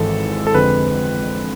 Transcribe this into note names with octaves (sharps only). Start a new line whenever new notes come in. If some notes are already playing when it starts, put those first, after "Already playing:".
Already playing: G#1 G#2 E3 G#3 A4
A4
F2 D3 G#3 C4 B4